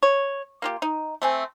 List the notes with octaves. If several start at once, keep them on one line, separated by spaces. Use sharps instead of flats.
C#5
A#3 F4 G4
D#4
A3 C4 G#5